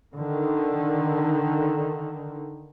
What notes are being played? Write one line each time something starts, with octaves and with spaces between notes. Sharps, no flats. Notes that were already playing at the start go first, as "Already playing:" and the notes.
D3 D#3